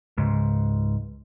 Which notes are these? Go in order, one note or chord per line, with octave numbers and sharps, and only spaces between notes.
C#2 G#2